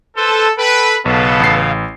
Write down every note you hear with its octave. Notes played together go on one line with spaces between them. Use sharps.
A4 B4 C5 C6
A4 B4 G5 B5
B1 C#3 B3 A4 F5
A1 C7